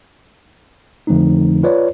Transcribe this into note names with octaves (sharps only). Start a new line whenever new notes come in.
F2 D3 F3 A3 C4 D#4
F4 B4 C#5 D5